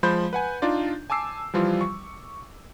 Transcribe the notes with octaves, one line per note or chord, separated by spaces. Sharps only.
F3 G#3 C5 B5 G6
B4 F#5 G#5
D4 D#4 F4 D5
G#5 A5 D6 E6 C7
E3 F3 G3 F4
C#6